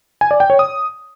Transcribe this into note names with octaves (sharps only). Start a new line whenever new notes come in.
G#5
D5
G5
C#5
D#6